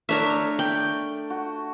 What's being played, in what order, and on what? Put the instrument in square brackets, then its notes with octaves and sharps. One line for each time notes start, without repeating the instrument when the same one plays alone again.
[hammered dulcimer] A3 D4 [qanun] A#4 C#5 E5
[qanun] G5
[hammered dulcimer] F#4